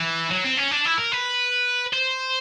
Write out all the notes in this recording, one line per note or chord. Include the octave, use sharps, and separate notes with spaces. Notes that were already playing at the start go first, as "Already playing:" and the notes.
Already playing: E3
F#3
C4
C#4
D4
E4
A#4
B4
C5